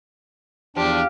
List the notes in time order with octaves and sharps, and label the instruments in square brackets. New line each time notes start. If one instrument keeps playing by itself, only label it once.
[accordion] E2 D4 [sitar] F3 [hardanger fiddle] G4